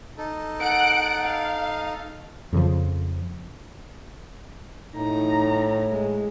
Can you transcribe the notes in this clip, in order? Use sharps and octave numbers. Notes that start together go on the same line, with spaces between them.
D#4 A4
F#5 F#6 D7
F5
F2 C#3 F3
A2 D#4 A#5
G#3